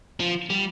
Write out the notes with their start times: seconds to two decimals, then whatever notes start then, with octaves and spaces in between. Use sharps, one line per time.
0.20 F3
0.50 G3